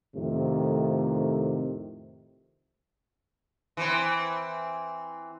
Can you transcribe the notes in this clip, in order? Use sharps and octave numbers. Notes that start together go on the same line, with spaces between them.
F2 A2 C3 D#3
E3 C4